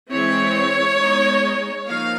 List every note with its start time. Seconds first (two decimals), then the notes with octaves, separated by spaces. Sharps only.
0.10 E3 G#3 C4 E4 C#5
0.98 G#3 B3 D#4
1.87 F3 A#3 D#4 F5